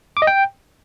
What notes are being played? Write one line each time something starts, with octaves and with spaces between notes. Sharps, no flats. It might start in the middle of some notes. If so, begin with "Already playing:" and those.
D6
D#5
G5